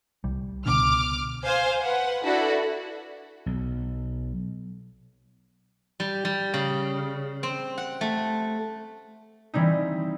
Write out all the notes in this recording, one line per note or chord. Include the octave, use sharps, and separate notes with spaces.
C2 G3
C#2 B2 D3 D6 F6
C5 F5 G#5
B4 F#5
D4 E4 F#4 A4
B1
G3
G3
C#3
C4
F#5
A3
E3 G3 C4 D#4